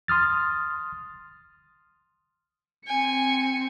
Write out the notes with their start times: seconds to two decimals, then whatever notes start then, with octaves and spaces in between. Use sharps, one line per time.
0.08 C6 D#6 F6 A6
2.87 C4 G#5 C#7